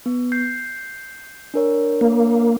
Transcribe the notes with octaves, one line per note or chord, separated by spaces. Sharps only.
B3
G6 C7
D4 A#4 C#5
A#3